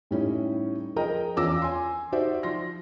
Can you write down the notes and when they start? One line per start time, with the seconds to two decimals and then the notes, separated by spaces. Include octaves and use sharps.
0.11 A2 G3 C#4 D#4 E4
0.96 F3 G#4 A#4 D#5 G5 A#5
1.36 E2 C#4 F4 D6 E6 A#6
1.62 G#5 C6
2.12 D#4 F#4 G4 C5 D5 E5
2.43 F3 C6 A#6